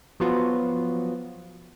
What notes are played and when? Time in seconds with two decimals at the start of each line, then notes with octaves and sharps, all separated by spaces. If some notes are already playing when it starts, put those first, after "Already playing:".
0.20 F3 F#3 B3 F4 F#4